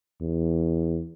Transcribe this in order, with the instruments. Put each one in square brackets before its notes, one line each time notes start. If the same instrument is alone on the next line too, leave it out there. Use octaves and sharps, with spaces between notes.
[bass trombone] E2